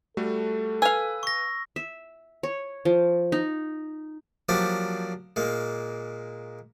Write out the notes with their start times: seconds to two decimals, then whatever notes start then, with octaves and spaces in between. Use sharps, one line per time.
0.17 G3 A3 F#4 A4
0.82 B4 F5 G#5 E6
1.23 C#6 A#6
1.76 E5
2.43 C#5
2.85 F3
3.32 D#4
4.49 F3 F#3 A#3 D4 G4 C5
5.36 A#2 G#3 A#3